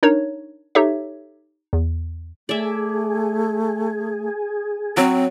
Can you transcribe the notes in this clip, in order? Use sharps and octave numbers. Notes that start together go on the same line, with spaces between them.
D4 D#4 A#4 C#5
D#4 G4 A4 C#5 E5
E2
A3 G#4 D5 E5
F#3 C4